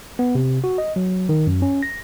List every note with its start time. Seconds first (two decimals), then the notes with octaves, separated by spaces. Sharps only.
0.19 B3
0.35 C3
0.64 F#4
0.78 D#5
0.96 F#3
1.29 D#3
1.47 F#2
1.62 C#4
1.83 A#6